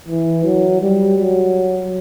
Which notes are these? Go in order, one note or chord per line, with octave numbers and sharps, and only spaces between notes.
E3
F#3
G3
F#3